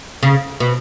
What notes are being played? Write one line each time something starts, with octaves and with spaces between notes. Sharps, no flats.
C#3
B2